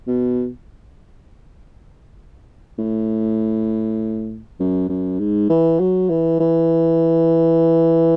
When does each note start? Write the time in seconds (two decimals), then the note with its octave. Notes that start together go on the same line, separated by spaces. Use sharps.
0.07 B2
2.78 A2
4.60 F#2
4.89 F#2
5.19 G#2
5.50 E3
5.80 F#3
6.10 E3
6.40 E3